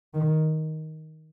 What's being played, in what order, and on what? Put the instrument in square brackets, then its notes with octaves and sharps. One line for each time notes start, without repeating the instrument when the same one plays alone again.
[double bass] D#3